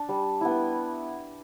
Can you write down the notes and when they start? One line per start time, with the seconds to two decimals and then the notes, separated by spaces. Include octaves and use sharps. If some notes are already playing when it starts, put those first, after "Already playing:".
Already playing: D4 A5
0.09 G3
0.41 B3 E4